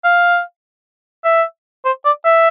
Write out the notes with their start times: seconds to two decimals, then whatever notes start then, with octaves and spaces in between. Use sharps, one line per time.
0.04 F5
1.24 E5
1.85 C5
2.05 D5
2.25 E5